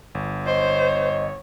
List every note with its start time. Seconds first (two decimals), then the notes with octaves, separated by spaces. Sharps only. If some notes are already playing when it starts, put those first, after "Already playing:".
0.15 G1
0.46 C5 C#5 D#5